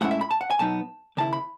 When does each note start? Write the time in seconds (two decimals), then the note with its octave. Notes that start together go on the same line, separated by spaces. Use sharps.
0.01 A2 G#3 C#4 E4 F#5
0.11 E5
0.21 B5
0.31 A5
0.41 F#5
0.50 G#5
0.59 B2 F#3 B3 D#4 A5
1.17 D#2 C#3 E4 A5
1.33 B5